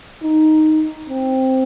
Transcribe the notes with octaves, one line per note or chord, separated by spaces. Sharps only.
D#4
C4